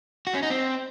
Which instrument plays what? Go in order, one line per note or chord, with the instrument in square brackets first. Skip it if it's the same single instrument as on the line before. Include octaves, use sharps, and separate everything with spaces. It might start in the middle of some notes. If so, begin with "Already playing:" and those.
[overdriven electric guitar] F#4
C#4
D#4
C4